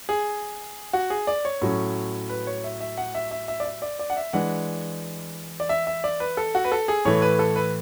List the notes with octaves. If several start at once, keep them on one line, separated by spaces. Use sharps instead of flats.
G#4
F#4
G#4
D5
C#5
A2 F#3 C#4
B4
C#5
E5
E5
F#5
E5
E5
E5
D5
E5
D5
D5
F#5
E5
E3 G#3 D4 F#5
D5
E5
E5
D5
B4
A4
F#4
B4
A4
G#4
A2 E3 A3 C#5
B4
A4
B4